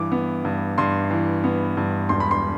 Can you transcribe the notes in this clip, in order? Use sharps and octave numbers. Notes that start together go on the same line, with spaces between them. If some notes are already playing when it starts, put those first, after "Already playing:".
Already playing: G2 E3 D6
B3
G2
G2 C6
E3
B3
G2
E1 C6
B5
C6